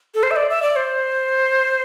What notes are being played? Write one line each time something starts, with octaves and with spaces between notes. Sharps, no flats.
A4
C5
E5
D5
E5
D5
C5